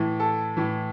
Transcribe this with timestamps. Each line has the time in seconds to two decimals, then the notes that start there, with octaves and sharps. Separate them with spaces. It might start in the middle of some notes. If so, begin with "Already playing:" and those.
Already playing: A2 E3
0.20 A4
0.57 A2 E3